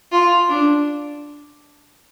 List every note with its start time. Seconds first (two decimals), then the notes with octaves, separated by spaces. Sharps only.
0.12 F4
0.49 D4